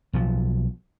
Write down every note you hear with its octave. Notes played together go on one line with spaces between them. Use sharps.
B1 F3